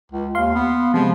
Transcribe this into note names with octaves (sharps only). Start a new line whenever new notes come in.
C#2
D#2 F5 C6
B3
C3 F3 G#3